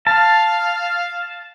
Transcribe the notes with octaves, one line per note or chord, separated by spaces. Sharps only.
F5 A5